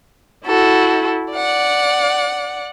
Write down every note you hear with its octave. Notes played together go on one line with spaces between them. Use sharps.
E4 F#4 A4
D5 F#5